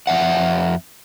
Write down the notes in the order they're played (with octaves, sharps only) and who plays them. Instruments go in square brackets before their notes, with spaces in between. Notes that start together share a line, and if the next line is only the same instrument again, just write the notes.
[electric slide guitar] F2 E5 F#5